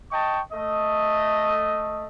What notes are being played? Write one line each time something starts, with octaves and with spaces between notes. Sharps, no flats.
D#5 G5 A5 C#6
A3 D#5